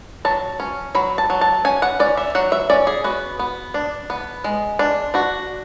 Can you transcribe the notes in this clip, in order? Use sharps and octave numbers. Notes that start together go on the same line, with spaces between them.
F#3 A5
C#4
F#3 B5
A5
F#3
A5
C#4 G#5
F#5
C#4 D5
E5
F#3 F#5
E5
C#4 D5
G#4
B3 F#4
B3
D4
B3
G#3
D4
D4 F#4